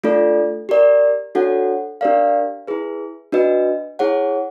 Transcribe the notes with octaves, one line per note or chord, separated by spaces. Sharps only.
A3 D4 F4 A4 D5
G4 A#4 D5
D4 F#4 A4 C#5 F#5
D4 G4 A#4 D5 F5
E4 G#4 B4
D4 F#4 B4 D#5
E4 G#4 C#5 F#5